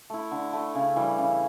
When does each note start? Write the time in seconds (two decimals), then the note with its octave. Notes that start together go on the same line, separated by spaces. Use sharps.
0.10 A3 E4
0.31 D3
0.53 A3 E4
0.75 C#3
0.96 E3 G3
1.18 C#3